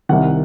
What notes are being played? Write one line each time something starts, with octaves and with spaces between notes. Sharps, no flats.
C2 C3 D#3 F#5